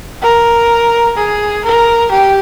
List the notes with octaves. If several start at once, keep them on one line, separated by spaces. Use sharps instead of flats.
A#4
G#4
A#4
G4